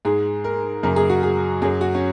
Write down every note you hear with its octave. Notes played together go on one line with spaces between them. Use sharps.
G#2 G#3 G#4
A#4
F#2 C#3 F#3 A#4
G#4
F#4
G#4
F#2 F#3 G#4
F#4
C#4